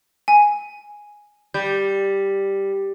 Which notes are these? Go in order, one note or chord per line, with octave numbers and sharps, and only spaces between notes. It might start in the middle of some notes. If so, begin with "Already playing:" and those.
G#5
G3 G6